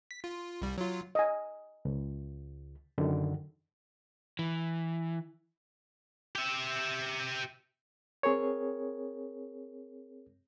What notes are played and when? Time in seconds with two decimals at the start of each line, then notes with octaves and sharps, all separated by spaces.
0.11 B6
0.24 F4
0.62 C2 G3
0.78 F#3 F4
1.15 D#5 G#5
1.85 C#2
2.98 F#2 D3 D#3
4.39 E3
6.35 G4 E5
8.23 C4 G#4 A#4 C#5